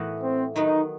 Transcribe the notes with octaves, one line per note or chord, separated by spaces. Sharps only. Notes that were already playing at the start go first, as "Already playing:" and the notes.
Already playing: A2 E3 B3 F#4 A4
C4
D#3 F#3 B3 D#4